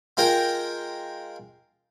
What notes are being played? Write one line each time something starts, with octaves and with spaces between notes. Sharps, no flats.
G#3 F4 A#4 G5